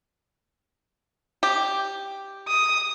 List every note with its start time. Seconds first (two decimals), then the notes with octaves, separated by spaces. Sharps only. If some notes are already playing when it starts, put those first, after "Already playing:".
1.43 G4
2.48 D#6